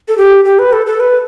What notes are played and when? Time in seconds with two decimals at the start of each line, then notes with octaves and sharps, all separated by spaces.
0.08 A4
0.18 G4
0.45 G4
0.59 B4
0.73 A4
0.86 A4
1.00 B4